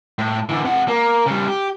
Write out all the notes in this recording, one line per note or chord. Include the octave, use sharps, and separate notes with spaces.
A2
D3 E3
C3 F#5
A#3
C#3 G3
G4